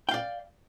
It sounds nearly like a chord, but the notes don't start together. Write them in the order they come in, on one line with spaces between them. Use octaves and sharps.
G5 F5 D5